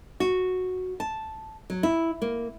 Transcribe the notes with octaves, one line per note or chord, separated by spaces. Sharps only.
F#4
A5
F#3
E4
A#3